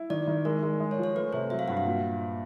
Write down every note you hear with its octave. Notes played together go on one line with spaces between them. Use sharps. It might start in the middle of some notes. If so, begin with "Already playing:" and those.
Already playing: E4
D#3 D5
D#3
G#3 A#4
G#3
G#3
C#5
F3
C#5
A3 B4
C3 C5
F#3 E5
F5
G2 F#5
F5
A#2